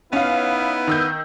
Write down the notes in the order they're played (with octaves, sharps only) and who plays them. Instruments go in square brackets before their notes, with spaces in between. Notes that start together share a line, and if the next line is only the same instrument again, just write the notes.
[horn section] B3 D#4 E4 [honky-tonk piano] C#4 F5
[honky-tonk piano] D#3 E6 G6